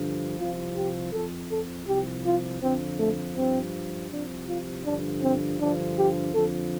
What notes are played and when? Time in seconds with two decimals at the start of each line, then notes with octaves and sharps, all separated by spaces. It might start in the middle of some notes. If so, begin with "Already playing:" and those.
Already playing: G2 D3 F3
0.39 C2 C3 F3 F4
0.76 G4
1.13 F2 F3 A4
1.50 A4
1.88 C2 C3 F3 G4
2.25 F4
2.62 F2 D3 F3 C4
2.99 A3
3.36 G2 F3 C4
4.10 C2 C3 F3 D4
4.47 F4
4.84 G2 D3 F3 D4
5.22 C4
5.59 G2 D3 F3 D4
5.97 G4
6.34 F2 D3 F3 A4